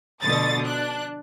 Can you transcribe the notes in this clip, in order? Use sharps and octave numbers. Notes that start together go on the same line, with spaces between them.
B2 D3 F3 A3 D#6 A6
D4 F#6